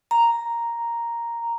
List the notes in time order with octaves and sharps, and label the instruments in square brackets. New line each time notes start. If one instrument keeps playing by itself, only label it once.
[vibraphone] A#5